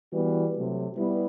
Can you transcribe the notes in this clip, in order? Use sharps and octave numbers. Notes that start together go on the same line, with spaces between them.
E3 G3 B3 F#4 B4
C3 F#3 A3
G3 B3 E4 B4